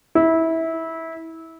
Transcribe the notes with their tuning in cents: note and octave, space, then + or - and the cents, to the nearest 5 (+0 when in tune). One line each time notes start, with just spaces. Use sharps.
E4 -20